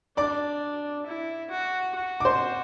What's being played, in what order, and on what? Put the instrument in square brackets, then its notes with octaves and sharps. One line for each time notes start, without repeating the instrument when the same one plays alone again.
[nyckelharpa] D4 [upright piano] D5 D6
[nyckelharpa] E4
F#4
F#4
[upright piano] D6
C5 C6